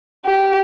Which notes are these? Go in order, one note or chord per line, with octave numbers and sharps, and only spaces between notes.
G4